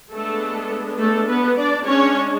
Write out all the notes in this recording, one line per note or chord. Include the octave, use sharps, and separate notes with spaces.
G#3 A3 B3 D4 A4
A3 A4
B3 B4
D4 D5
G#3 C#4 D4 C#5